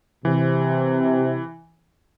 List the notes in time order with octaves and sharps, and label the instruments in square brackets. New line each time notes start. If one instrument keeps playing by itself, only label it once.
[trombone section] C3 [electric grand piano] E3